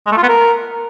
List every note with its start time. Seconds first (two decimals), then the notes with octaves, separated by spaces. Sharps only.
0.06 G#3
0.12 A3
0.17 F4
0.23 B3
0.28 A#4